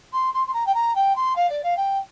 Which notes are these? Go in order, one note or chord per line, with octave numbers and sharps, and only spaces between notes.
C6
C6
C6
A#5
G5
A#5
G5
C6
F5
D5
F5
G5